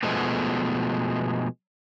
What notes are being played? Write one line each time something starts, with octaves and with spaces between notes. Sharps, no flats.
B2 F3 G#3 A3 B3